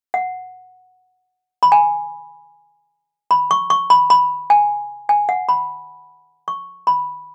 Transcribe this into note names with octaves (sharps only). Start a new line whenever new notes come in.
F#5
B5
G#5
B5
C#6
C#6
B5
B5
G#5
G#5
F#5
B5
C#6
B5